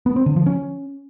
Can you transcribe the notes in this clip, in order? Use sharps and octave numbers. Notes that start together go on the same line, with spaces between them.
B3
C4
D3
F3
C#4